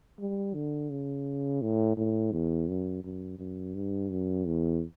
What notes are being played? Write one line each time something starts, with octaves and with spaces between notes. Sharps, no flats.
G3
D3
C#3
A2
A2
E2
F#2
F#2
F#2
G2
F#2
E2